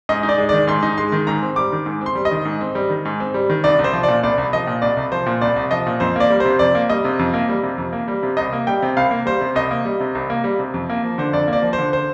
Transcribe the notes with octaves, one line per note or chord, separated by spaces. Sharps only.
G#2 D#5
D#4
D5
G#3
D#3 D5
G#2 C6
D#4
G#3 C6
D#3
G#2 A#5
C4
G3 D6
D#3
G#2
C4
C6
G3
D#5
D#3
G#2
C4
G3
D#3
G#2
C4
G3
D#3
C2 D5
C2
C5
F3
A#2 D5
C2 D5
C2
F3 D#5
A#2
C2 D5
C2
F3 C5
A#2
C2 D5
C2
F3 D#5
A#2
F2 C5
A#3 D5
G3
C3 C5
F2 D5
A#3
G3 D#5
C3
F2
A#3
G3
C3
F2
A#3
G3
C3
C2 D#5
A#3
G3 G5
C3
C2 F5
A#3
G3 C5
C3
C2 D#5
A#3
G3
C3
C2
A#3
G3
C3
F2
A#3
F3
D3 C5
F2 D5
A#3
D5
F3
C5
D3
C5